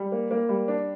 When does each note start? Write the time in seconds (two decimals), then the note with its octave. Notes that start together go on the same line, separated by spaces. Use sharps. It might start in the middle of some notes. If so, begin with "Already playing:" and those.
Already playing: G3
0.12 A#3
0.31 A#3
0.49 G3
0.68 D4